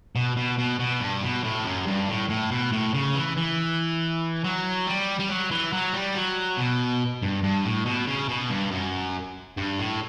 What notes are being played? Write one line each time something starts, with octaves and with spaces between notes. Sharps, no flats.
B2
B2
B2
B2
G2
B2
A2
F#2
G2
A2
A2
B2
A2
C#3
E3
E3
F#3
G3
G3
F#3
E3
F#3
G3
F#3
B2
G2
G2
A2
B2
C#3
B2
G2
F#2
G2
A2